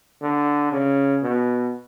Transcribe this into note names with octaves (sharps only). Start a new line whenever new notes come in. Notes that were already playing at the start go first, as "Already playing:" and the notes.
D3
C#3
B2